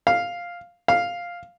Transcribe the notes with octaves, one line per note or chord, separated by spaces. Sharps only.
F5
F5